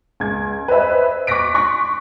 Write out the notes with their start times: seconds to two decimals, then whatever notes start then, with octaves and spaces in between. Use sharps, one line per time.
0.20 C#2 G#6
0.68 B4 C5 D#5 E5 B5
1.27 C#6 D6 F#6 A#6 B6 D7
1.54 C6 C#6 F#6 A#6 B6